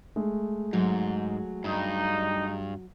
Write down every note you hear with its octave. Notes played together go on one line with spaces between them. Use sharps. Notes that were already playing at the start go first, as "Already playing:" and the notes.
G#3 A3
G#2 F#3
G2 D#4